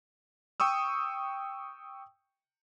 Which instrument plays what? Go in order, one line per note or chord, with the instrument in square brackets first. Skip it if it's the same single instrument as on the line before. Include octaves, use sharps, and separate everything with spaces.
[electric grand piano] G5 C#6 D#6 E6